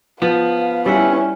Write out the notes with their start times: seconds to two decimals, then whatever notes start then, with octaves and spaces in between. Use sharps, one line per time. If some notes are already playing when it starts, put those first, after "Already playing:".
0.22 F3 B3 F5
0.86 G3 C#4 E4 E5 F#5